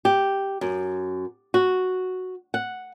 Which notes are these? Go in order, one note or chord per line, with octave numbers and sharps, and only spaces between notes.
G4
F#2
F#4
F#5